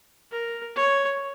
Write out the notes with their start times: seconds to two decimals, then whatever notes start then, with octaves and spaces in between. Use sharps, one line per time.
0.32 A#4
0.76 C#5